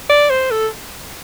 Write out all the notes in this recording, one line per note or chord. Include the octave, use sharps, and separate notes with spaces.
D5
C5
A4